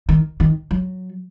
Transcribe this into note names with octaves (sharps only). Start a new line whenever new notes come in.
D#3
D#3
F#3